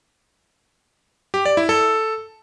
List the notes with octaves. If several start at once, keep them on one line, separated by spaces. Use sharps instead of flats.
G4
D5
E4
A4